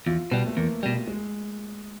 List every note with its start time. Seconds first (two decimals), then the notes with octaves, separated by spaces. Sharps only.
0.06 E2 F4
0.31 B2 G3 B3
0.46 A3
0.57 E2 A#3
0.83 B2 G3
1.07 G#3